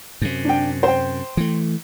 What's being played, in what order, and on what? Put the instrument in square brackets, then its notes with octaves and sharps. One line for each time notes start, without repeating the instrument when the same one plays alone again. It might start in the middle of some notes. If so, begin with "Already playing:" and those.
[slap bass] F#2 C3
[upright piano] D4 G5
C5 G5
[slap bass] E3 A3